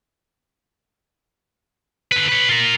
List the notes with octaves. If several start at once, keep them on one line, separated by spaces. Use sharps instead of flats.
D3 B4
B4 C#5
F4 A#4